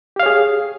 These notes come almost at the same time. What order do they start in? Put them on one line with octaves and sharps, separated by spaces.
G4 F5 C#5 G#4